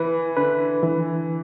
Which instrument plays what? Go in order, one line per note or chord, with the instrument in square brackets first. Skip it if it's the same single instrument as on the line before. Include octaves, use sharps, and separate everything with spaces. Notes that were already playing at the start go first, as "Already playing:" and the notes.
Already playing: [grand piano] E3 [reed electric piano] E4 B4
[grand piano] D3 [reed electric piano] B4
[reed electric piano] E3